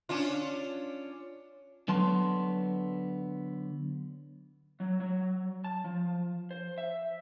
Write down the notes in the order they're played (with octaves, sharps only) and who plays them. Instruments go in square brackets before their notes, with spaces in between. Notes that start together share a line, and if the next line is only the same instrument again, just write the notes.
[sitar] C#4 D4 F4
[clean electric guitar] D3 F#3 B3 A5 C6
[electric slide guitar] F#3
F#3
A5
F3
C5
E5